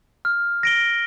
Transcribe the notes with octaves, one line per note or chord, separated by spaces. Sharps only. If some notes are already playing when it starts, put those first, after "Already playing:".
F6
A#6 D7 G7